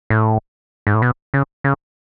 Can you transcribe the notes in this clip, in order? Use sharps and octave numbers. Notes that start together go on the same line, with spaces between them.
A2
G#2
A2
B2
C#3
C#3